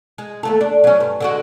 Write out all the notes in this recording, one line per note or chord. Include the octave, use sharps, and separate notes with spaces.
G#3
D#2 A3 A4
D4
F#3 C#4
G2
D3 G#3 F#4